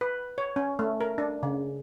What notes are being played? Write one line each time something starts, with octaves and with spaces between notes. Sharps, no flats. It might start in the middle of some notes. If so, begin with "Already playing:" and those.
B4
C#5
C#4
A3
A#4
D4
C#3